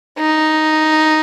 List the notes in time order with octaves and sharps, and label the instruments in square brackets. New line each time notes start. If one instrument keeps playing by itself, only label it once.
[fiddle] D#4